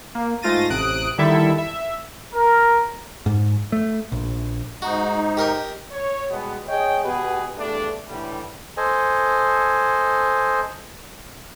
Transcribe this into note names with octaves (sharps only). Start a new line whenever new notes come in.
A#3
G#2 A3 F4 A6 A#6 D#7
A1 C3 D#6 F#6 D7
D3 D#3 G3 E4 A4 E5
E5
A#4
G#2
A3
A#1
G#2 D#4 F#4
G4 A#4 D#5
C#5
B2 G3 G#3 B3
G#4 C#5 D#5 G5
B2 B3 G4 G#4 B4
E2 G2 A3 D4
A2 D3 E3 G3
A4 C5 D#5 G#5